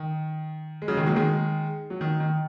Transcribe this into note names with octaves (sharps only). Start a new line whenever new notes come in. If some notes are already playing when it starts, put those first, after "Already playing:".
Already playing: D#3
G#3
C#3 F#3
D#3 G#3
F#3 A#3
D#3 G#3
F#3
D#3
D#3